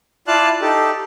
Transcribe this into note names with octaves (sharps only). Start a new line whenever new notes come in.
E4 F4 D5 F5 A5 F#6
D#4 G4 A4